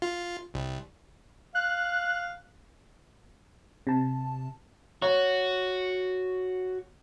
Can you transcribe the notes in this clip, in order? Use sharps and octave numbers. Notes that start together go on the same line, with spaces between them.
F4
C2
F5 F#6
C3 A5
F#4 C#5